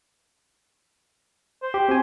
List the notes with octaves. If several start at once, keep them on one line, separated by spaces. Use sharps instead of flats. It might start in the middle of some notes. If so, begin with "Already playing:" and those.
C5
G4
C4 F#4 G#5